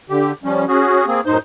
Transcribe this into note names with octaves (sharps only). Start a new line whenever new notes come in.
D3 G4
F3 G3 C#4
C#4 F#4 G#4
A#3 C4 G#4
F#2 A2 D#4 C5 G6